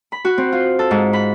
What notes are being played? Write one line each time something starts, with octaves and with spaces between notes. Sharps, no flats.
B5
F#4
C4
F4
A4
G#2
B5